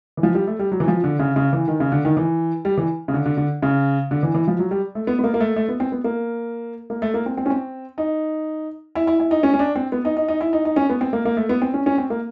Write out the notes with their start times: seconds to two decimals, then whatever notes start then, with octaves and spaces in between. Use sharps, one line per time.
0.17 E3
0.23 F3
0.35 G3
0.47 A3
0.59 G3
0.72 F#3
0.80 E3
0.88 F3
1.04 D3
1.19 C#3
1.36 C#3
1.53 E3
1.68 D#3
1.80 C#3
1.92 D3
2.05 D#3
2.17 E3
2.65 G3
2.77 E3
3.08 C#3
3.14 D3
3.26 D3
3.37 D3
3.62 C#3
4.11 D3
4.23 E3
4.34 E3
4.48 F3
4.59 F#3
4.71 G3
4.95 A3
5.07 B3
5.19 B3
5.24 A#3
5.34 A#3
5.40 A3
5.56 A3
5.69 B3
5.80 C4
5.92 B3
6.04 A#3
6.90 A#3
7.02 A3
7.14 A#3
7.26 C4
7.37 C4
7.46 C#4
7.50 C4
7.98 D#4
8.95 E4
9.07 E4
9.20 E4
9.31 D#4
9.43 C#4
9.54 C#4
9.59 D4
9.75 C4
9.92 B3
10.05 D#4
10.17 D#4
10.28 D#4
10.41 E4
10.53 D#4
10.65 D#4
10.76 C#4
10.89 B3
11.01 C4
11.13 A#3
11.25 A#3
11.37 A3
11.49 B3
11.62 C4
11.74 C#4
11.86 C#4
11.98 C4
12.10 A#3